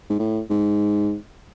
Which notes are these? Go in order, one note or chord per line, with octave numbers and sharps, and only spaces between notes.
G#2
A2
G#2